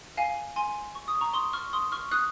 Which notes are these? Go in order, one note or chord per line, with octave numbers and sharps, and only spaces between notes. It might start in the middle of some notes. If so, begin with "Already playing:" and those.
F5 G#5
G#5 C6
C#6
D#6
A#5 C#6
C6 D#6
C#6 F6
C6 D#6
C#6 F6
D#6 F#6